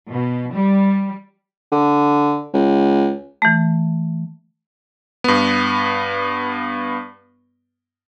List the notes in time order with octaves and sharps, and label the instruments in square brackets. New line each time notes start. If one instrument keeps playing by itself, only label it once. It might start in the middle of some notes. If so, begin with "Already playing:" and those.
[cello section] B2
G3
[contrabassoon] D3
C#2
[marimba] E3 A3
[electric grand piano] G2 B3